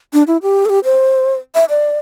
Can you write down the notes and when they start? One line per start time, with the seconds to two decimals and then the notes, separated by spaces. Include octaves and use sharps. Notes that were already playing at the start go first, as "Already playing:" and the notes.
0.13 D4
0.27 E4
0.42 G4
0.65 A4
0.69 G4
0.84 C5
1.55 E5
1.69 D5